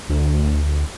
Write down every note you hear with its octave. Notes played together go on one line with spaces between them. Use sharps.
D2